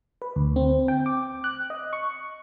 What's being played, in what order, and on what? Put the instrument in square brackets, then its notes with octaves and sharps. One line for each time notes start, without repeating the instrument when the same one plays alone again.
[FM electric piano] B4
D2
C4
G5
D6
F#6
D#5
C#6